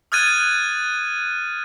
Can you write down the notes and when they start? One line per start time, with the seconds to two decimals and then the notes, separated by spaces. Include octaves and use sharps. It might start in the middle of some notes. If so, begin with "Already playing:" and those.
0.12 D#6 F6 F#6 G#6 A6 D#7